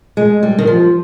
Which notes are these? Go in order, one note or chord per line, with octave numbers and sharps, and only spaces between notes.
G#3
G3
D#3
F3